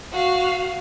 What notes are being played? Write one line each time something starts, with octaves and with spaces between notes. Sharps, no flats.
F#4 F5